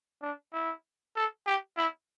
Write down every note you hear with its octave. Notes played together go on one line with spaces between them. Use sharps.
D4
E4
A4
G4
E4